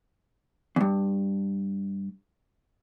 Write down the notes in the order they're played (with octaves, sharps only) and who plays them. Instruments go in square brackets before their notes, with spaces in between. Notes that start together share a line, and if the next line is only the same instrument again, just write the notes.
[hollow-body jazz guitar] E2 G2